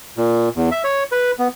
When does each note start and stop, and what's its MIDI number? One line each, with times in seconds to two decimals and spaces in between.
0.18 0.49 46
0.56 0.69 40
0.72 0.82 76
0.84 1.04 73
1.12 1.31 71
1.39 1.48 59